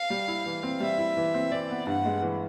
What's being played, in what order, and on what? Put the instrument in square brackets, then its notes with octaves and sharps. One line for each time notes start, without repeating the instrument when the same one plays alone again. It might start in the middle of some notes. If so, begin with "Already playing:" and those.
Already playing: [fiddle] F5
[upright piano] G3
E4
E3
C4
[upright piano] G3 [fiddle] E5
[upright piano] E4
E3
C4
[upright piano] E3 [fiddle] D5
[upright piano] B3
[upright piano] G2 [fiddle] F#5
[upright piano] G#3
E3